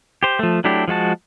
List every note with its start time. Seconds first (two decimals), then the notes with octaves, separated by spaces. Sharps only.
0.23 G4 C5
0.39 F3 A3
0.64 F#3 A3 D4 E4 G4
0.88 F3 G#3 F#4 A5